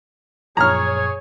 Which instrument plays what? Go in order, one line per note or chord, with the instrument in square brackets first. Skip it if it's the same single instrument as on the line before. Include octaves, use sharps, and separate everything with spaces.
[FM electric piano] F#2 A#2 F3 [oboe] G#4 [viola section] C#5 [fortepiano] A#5 F6